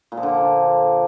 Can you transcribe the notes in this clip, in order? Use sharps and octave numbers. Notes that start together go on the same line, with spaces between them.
A#2
F3
D3